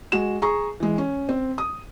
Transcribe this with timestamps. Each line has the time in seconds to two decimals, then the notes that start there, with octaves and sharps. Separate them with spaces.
0.12 G#3 F#4 E7
0.42 G#4 A#5 C#6
0.80 E3 G#3
0.98 C#4
1.29 C4
1.58 D#6